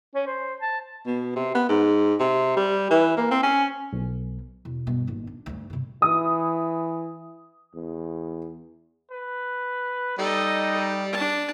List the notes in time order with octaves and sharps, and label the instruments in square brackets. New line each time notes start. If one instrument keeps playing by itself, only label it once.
[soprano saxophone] C#4
C5
A5
[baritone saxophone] B2
C3
B3
G#2
C3
G3
E3
A#3
C4
C#4
[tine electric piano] B1
[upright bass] E1
G2 B2
G#1 A#2
D4
D2 G2
G2 C3
[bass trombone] E3 [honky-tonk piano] D#6
[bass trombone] E2
[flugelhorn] B4
[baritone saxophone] G3 [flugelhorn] D#4 [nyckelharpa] A4 D#5
[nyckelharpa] D4 A5